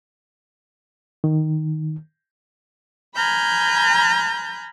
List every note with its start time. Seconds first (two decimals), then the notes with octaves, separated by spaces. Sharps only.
1.24 D#3
3.15 G#5 A#5 B5 F6 G6